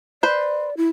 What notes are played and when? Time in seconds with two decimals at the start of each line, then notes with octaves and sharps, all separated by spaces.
0.23 B4 C5 D5
0.77 E4